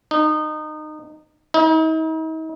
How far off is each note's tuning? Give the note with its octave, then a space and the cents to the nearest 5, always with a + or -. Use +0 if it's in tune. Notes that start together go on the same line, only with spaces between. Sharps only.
D#4 -25
D#4 +40